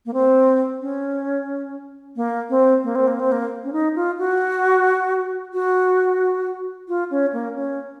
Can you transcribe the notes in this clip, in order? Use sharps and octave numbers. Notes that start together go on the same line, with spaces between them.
A#3
C4
C#4
A#3
C4
A#3
C4
A#3
C4
A#3
C#4
D#4
F4
F#4
F#4
F4
C#4
A#3
C#4